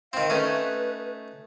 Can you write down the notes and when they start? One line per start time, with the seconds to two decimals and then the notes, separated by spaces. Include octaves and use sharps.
0.13 D#3 C4 F5
0.30 A3 C#4 D#4 B4